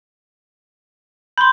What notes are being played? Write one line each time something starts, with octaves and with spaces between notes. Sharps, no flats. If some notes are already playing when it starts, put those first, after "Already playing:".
B5 C6 G6